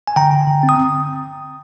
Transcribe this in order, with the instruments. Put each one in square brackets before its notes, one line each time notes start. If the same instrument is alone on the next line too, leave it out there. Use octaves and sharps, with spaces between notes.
[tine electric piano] G#5
D3 G5 A#5
D3
D3
C4
D#6